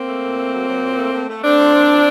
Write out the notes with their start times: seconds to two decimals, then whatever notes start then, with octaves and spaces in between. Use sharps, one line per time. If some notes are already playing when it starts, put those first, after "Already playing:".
Already playing: A#3 C4
0.09 A3
0.24 A#2
0.39 A3
0.53 F#3
0.69 F#3
0.83 A#2
0.98 A3
1.14 A3
1.29 A3
1.43 A3 C4 D4
1.60 F3
1.75 A#2
1.90 F3